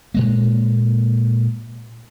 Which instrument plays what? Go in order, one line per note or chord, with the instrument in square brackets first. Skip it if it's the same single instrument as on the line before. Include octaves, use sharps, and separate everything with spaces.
[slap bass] A#2 G#3 A#3